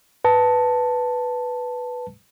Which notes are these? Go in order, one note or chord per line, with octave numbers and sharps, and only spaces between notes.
B4 A5